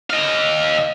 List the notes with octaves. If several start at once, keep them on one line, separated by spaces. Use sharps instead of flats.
D#5 F5